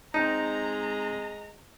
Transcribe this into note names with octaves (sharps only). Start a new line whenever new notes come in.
G#3 C4 D#4 A5 A#5